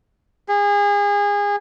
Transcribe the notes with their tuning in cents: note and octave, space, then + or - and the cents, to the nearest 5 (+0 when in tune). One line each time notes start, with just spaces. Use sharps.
G#4 -30